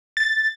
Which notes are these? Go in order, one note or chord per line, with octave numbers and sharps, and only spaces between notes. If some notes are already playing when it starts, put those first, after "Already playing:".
A6